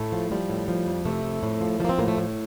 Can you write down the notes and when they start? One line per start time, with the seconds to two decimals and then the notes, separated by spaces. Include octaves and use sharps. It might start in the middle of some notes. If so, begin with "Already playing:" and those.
Already playing: A2 A3
0.12 F3
0.31 F3 G3
0.50 A2
0.68 F3
0.87 F2
1.05 C3 A3
1.24 F2
1.43 A2
1.61 F3
1.80 F3 A3
1.85 A#3
1.89 C4
1.99 A2 A#3
2.08 A3
2.18 A2